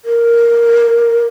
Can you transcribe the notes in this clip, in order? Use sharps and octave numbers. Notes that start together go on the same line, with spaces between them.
A#4